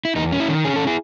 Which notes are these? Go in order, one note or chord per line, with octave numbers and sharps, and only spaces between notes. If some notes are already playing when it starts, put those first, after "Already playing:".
E4
E2 D#4
C#4
E4
D#3
C#4 G#4
A4
E4 G#4